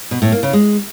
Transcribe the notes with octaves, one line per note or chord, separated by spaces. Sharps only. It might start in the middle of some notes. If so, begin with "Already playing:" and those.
B2
A2
A#3
C#3
G#3